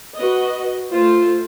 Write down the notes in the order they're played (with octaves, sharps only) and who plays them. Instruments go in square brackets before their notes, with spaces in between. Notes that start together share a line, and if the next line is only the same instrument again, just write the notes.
[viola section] F#4 B4 D#5
[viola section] A3 C5 [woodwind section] F4